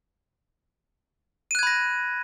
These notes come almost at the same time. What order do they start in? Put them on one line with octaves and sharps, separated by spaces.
D#7 F#6 G#6 B5 A#6